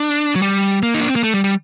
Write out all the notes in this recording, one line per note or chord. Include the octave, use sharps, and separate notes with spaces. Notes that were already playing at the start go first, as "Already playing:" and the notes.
Already playing: D4
F#3
G3
A#3
D#4
D4
C4
A#3
A3
G3
G3